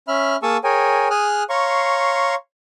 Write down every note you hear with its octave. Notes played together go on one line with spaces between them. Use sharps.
C#4 E5 B5 F6
A#3 G#4 A5 C#6 D#6 E6
G#4 A#4 C#5 G5 G#5
G#4 G#5 D#6 F6 F#6
C#5 F5 A#5 C6 C#6